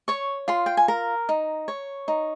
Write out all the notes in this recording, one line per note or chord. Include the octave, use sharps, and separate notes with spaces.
C#5 C#6
F4 C6
G5
G#5
A#4 A#5
D#4
C#5
D#4